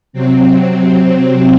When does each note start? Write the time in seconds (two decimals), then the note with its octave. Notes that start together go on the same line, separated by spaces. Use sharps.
0.13 C3 F#3 C4
0.80 C4